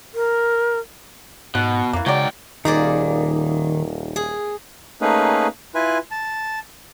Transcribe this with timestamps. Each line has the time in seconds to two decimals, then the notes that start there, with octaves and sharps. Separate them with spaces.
0.14 A#4
1.55 G#2 B2 F#5
1.93 F2 E3 A#3
2.06 G#2 C#3 F#3 D5 G5
2.65 D#1 D#3 A#3 D#4 G#4 D5
4.16 G#4
5.01 A3 A#3 C#4 D#4 G#4 B4
5.75 E4 F4 B4 G#5
6.11 A5